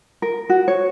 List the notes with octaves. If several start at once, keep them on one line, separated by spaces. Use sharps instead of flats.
A#4
F#4
C#5